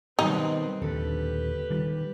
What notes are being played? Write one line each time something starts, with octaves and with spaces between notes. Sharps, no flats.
B2 D#3 G3 C4 D#4 B4
D#1 D#2 D3 G4 A4 B4
D#3 G3